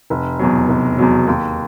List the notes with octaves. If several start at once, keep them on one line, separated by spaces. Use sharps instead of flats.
F1
E2 B2 F#3
F1
E2 B2 F#3
D#2